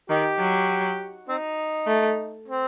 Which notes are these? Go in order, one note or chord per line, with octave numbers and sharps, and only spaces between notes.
D#3 D#4 G4
F#3
C4 D#4
A3
C4